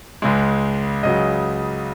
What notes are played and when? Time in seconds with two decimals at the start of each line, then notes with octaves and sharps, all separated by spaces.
0.22 C#2 C#3 G#3
1.03 C#2 C#3 F#3 D#5